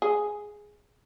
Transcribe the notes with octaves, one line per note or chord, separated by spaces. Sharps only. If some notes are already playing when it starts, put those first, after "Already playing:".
G#4